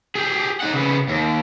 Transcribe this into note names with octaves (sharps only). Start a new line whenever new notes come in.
G4 G#4
D#4 F#5
C#3 B3
D#2